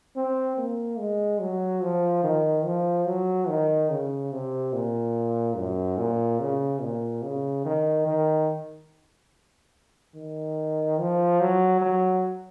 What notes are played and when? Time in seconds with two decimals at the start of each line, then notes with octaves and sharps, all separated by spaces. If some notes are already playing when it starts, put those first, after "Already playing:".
0.16 C4
0.58 A#3
0.99 G#3
1.40 F#3
1.82 F3
2.24 D#3
2.65 F3
3.06 F#3
3.48 D#3
3.90 C#3
4.32 C3
4.73 A#2
5.57 F#2
5.98 A#2
6.40 C#3
6.81 A#2
7.23 C#3
7.65 D#3
8.06 D#3
10.15 D#3
10.99 F3
11.40 F#3
11.81 F#3